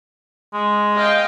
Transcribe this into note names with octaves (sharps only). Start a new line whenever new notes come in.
G#3
D#5 F5 G5